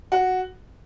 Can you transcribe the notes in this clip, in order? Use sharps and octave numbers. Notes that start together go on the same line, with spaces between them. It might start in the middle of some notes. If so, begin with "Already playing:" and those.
F#4